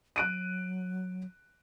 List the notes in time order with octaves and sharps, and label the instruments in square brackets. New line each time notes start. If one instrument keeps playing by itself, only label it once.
[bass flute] F#3 [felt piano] F#6 D7 D#7